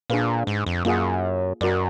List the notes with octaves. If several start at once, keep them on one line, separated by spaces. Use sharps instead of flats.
A#2 D4 G#4 B4 F5
G#2
F2
F#2 A#3 F4 G#4 D#5 F#5
F#2 F#4 A#4 D5